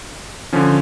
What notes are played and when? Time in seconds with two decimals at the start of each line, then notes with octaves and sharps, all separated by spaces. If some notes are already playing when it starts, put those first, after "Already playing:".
0.53 D3 F3 C#4